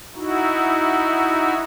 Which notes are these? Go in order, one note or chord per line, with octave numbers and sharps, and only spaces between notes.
D#4 E4 F#4